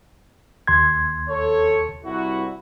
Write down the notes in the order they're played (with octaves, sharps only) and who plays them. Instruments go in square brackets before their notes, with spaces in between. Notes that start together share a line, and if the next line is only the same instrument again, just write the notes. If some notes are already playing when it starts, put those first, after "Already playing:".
[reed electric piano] D#2 C6 G#6
[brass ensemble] A4 C#5
C2 E4 F#4